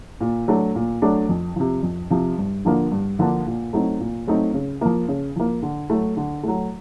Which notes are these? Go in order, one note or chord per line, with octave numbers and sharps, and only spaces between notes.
A#2
F#3 A3 D4
A#2
F#3 A3 D4
F2
C3 F3
F2
C3 F3
G2
D3 F3 A#3 D4
G2
D3 F3 A#3 D4
A#2
F#3 A3 C4 D#4
A#2
F#3 A3 C4 D#4
C#3
F3 A#3
C#3
F3 A#3
D3
F#3 A3
D3
F#3 A3